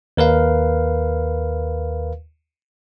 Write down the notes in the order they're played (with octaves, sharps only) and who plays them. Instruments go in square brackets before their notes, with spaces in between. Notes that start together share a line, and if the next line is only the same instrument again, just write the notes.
[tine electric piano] D#2 A#4 B4 F5